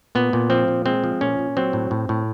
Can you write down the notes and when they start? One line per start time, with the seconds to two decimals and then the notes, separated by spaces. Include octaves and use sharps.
0.15 A#2 B3
0.33 A#2
0.50 F3 C4
0.68 A#2
0.86 G#3 C4
1.04 F3
1.21 A#2 C#4
1.39 A#2
1.57 F#3 C4
1.73 A2
1.91 A2
2.09 A2